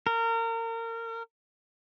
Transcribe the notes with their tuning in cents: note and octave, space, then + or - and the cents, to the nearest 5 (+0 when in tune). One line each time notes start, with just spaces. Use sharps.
A#4 -30